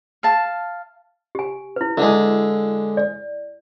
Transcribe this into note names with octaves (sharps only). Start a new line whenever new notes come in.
F5 A5
G4 G#5
E4 B4
D3 G#3 E4 E5
D5